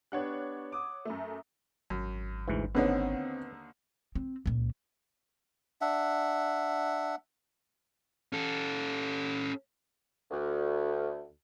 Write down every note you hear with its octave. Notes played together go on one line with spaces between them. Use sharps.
B3 D4 G4 C#5 F#5 F#6
D6 D#6
F#2 A3
G#1 F#2
D2 G#2 E3
D#2 D3 B3 C4 D#4 B4 C#5
C4
C#2 A#2
D4 E5 F#5
C#4 A4
D2